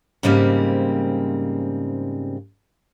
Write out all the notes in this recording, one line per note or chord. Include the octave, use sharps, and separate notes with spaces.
G#2 C#3 G3 A#3 C4